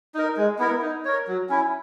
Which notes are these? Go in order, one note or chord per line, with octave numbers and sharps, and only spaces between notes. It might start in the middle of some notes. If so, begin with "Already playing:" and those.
D#4 A#4
G#3
B3 E4 A#4
D#4
A#4 C#5
F#3
C#4 E4